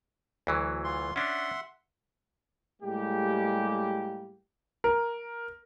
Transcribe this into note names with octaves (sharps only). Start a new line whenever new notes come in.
D2 E3 F#3
F4 C6
C#4 D4 E5 F#5 C6
A2 G3 G#3 A#3 G4
A#4